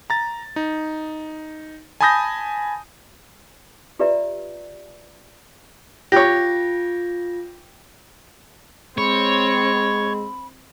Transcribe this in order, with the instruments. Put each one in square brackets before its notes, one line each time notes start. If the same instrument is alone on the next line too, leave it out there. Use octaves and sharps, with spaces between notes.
[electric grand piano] A#5 A6
D#4
G#5 A5 B5 D#6 G6 A#6
[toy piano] F4 G4 B4 D5 E5 A#5
[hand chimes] F4 A#6 [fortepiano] G4 C#5
[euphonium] G#3 [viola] C4 [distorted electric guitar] C#5 [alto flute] B5